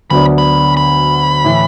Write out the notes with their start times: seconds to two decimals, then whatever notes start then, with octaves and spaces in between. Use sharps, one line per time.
0.10 D2 D3 F#3 B3 D4 B5
0.38 B5
0.77 B5
1.44 A2 E3